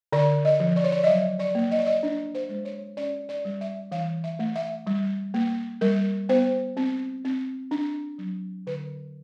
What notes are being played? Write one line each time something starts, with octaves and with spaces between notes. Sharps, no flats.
D3 D5
D#5
F3
D5
C#5
D5
D#5
F#3 E5
D5
A#3
D#5
D5
D#5
D4
C5
G#3
C#5
C#4 D5
D5
G3
E5
E3 F5
E5
A3
E5
G3
A#3
G3 A#4
B3 C5
C4
C4
D4
F#3
D3 B4